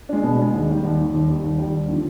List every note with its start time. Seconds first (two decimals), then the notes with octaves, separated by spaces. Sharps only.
0.09 G#3 D4
0.24 B2
0.39 G#3 D4
0.53 D#2
0.69 D#3 G3
0.84 D#2
0.98 D#3 G3
1.14 D#2
1.28 D#3 G3
1.43 D#2
1.58 D#3 G3
1.74 D#2
1.88 D3 F3